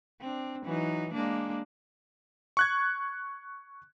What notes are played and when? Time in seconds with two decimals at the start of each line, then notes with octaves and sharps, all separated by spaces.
0.21 C4 D4
0.65 E3 F#3 D#4
1.14 G#3 A#3 D4
2.57 C#6 F#6 G#6